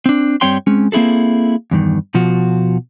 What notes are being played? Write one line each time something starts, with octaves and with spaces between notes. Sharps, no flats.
C4 D4
G2 G3 C4 C#5 G5 C6
G#3 C4 C#4
A#3 C4 E4 G#4 A4
E2 G2 D#3
B2 F3 F4 F#4